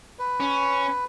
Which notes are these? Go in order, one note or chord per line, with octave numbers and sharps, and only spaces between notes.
B4
C#4